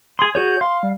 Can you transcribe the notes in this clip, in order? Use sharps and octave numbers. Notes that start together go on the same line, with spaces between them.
G#4 C6 D#6
F#4 G#4 C#5 G6
F5 C6
G3